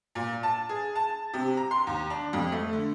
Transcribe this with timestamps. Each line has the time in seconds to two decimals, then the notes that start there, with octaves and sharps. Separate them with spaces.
0.15 A#2
0.43 A5
0.69 G#4
0.95 A5
1.33 C3
1.57 A#5
1.71 C6
1.87 D#2
2.10 D4
2.33 F2
2.52 A3
2.73 D3